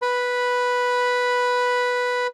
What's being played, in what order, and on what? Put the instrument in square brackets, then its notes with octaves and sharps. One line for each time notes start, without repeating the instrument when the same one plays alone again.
[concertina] B4 B5